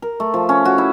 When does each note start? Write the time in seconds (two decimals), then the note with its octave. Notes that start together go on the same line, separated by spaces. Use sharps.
0.02 A#4
0.20 A3
0.34 F3
0.49 C#4
0.65 F#4
0.78 E4